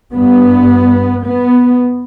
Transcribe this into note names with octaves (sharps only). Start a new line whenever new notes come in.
G2 B3
B3